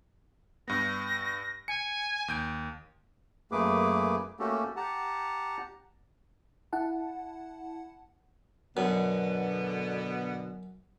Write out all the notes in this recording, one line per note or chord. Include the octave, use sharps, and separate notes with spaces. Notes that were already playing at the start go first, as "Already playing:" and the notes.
G2 B3 A#6
G#5 C#7
D#2 G6 D7
F#2 A3 A#3 G#4 B4 D6
A3 A#3 C#4 F#4 G4 A4
G4 F#5 A5 A#5
E4 F#5 A5
F#2 B2 D3 B3